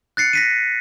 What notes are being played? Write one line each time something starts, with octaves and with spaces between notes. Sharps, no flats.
F#6 A6 C7 C#7
A#6 B6 D#7